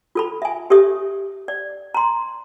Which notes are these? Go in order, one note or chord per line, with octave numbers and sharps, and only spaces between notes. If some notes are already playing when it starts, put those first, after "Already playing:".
F4 A4 B5
E5 G#5
G4 A4 C#5 E5 D#6
D5
A#5 C6